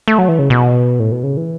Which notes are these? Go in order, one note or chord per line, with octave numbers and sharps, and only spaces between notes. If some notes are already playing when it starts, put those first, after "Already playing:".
A3
F#3
E3
C#3
B2
A2
B2
C#3
E3